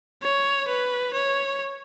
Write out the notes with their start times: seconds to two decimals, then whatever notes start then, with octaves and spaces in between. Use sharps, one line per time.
0.22 C#5
0.68 B4
1.13 C#5